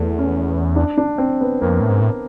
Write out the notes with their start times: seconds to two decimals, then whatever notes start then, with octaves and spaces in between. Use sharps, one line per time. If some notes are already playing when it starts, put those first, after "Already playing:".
Already playing: E2 A3
0.18 C#4
0.76 D4
0.98 D4
1.18 C4
1.41 B3
1.61 F2 A#3
1.81 A2
1.90 G#2
2.01 A2